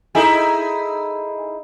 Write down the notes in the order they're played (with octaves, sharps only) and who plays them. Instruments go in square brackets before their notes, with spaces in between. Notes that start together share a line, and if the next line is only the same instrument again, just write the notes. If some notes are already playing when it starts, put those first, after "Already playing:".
[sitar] D#4 E4 G#4 [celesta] A4 G#5